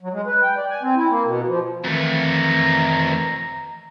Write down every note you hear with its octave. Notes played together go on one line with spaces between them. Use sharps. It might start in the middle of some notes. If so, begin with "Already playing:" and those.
F#3
G#3
B4
G5
D5
G#5
C4
E4
A#3
B2
F3
F2 D#3 E3 A3 A#5